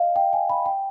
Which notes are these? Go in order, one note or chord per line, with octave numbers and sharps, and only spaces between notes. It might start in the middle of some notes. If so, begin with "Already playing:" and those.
Already playing: D#5 F5
G5
G#5
B5
G5